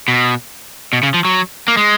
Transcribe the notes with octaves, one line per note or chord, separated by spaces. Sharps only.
B2
B2
C#3
F3
F#3
A#3
G#3